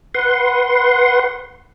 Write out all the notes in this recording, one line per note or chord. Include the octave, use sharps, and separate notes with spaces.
B4 F#5 C6